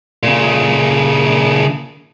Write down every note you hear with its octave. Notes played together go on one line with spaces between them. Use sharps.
A#2 C#3